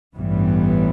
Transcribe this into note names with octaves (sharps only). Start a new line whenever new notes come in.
A1 G2 E3 G3 B3